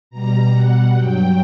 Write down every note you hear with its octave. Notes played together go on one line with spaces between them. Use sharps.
B2 G3 A#5
F#5
G2 F#3 G5